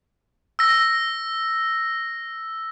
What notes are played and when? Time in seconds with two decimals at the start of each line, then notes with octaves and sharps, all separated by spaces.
0.59 E6 A#6